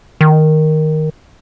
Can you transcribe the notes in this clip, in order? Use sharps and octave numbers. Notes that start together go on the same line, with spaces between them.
D#3